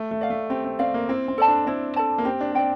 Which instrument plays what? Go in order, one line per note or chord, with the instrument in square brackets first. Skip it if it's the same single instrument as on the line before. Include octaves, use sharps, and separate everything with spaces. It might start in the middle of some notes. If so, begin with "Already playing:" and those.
Already playing: [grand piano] A3
A3
[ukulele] D5 F5
[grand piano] A3
[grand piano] C4 [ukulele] G4
[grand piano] C4
[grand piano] C4 [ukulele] D5 F5
[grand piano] A#3
[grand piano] C4 [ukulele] E4
[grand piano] C4
[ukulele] A4 D5 A5
[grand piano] D4
[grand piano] C4 [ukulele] E4
[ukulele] A4 D5 A5
[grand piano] A#3
[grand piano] C4 [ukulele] G4
[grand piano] D4
[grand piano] C4 [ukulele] D5 G5